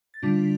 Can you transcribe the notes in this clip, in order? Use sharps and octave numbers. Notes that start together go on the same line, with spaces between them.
A6
D3 G3 D4 F4 B6